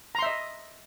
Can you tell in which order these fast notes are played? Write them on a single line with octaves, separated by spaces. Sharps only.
A#5 C6 E5 D#5